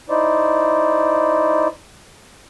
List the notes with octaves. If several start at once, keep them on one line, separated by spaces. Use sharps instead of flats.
D#4 E4 C5 D5